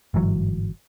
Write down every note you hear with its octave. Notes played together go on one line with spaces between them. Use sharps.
G1 G#2 E3 F#3